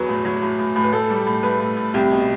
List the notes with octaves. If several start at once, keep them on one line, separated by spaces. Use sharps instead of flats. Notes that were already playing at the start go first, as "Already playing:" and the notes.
Already playing: E2 F#3 B4
A2
F#3
A2
A2
A2
B4
A2 A4
G3
A2
A2 B4
A2
A2
C2 G4
B2